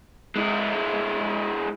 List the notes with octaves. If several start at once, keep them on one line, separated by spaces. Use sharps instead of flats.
G#3 E4